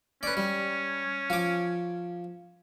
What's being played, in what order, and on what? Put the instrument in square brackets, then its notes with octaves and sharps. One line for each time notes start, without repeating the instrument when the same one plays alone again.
[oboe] C#4 [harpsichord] B4 D5
[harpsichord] G3
F3 D6